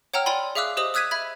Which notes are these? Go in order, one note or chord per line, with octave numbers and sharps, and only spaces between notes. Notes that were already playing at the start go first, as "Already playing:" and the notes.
C#5 F#5 G5 A#5 E6 F6
D5 G5 G#5 B5 C6
G#4 E5 F5 D6 E6 F#6
G4 C5 D#5 D#6 F#7
D#6 E6 F#6 G#6 B6 D#7
E5 B5 G#6